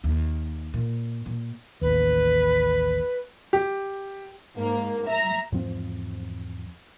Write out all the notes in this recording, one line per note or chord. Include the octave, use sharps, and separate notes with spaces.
D#2
A#2
A#2
A1 D#2 B4
G4
G#2 A#3
E5 A#5
E2 G#2 F3 C4